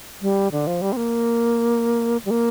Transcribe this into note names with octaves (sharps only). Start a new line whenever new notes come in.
G3
D3
F3
G3
C4
A#3
G3
A#3